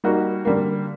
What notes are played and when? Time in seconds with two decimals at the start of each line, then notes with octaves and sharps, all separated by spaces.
0.04 G3 A#3 D#4 F#4
0.45 D3 G3 A#3